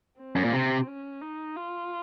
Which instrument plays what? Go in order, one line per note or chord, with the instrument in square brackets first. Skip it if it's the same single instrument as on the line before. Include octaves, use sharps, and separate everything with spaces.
[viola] C4
[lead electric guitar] F#2
A#2
C3
[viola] C#4
D#4
F4